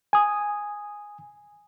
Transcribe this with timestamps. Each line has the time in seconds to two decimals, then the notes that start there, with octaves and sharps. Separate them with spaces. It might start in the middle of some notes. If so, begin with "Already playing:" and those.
0.13 G#5 D#6